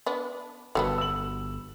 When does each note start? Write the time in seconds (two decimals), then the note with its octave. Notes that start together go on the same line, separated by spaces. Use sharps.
0.06 B3 D4
0.75 G1 F#3 G3 B3 A4
0.98 E6 F#7